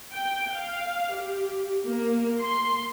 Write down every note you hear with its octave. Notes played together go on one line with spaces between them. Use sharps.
G5
F5
G4
A#3
C6